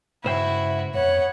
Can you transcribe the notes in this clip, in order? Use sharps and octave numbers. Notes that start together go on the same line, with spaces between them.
C#2 G2 E4 F#4 C5 G5
F2 B3 C#5 F#5